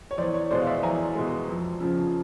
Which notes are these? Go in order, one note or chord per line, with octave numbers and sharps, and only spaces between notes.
C#5
E2 C5 D5
C#5
B2 G#3 C5 D5
F5
D5 E5
E2 G#5 A#5
B2 G#3
F2
C#3 F3